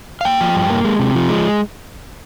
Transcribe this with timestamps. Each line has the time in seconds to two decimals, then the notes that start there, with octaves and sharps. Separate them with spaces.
0.21 F5
0.25 A#3 G5
0.41 F3
0.55 G2
0.70 A#3
0.85 G#3
0.99 C3
1.15 F3
1.29 G#3